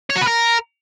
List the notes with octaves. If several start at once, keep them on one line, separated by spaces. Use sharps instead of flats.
C#5
F#4
B4
A#4